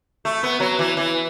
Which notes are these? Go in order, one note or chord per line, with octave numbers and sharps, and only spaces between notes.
A3
B3
F#3
E3
E3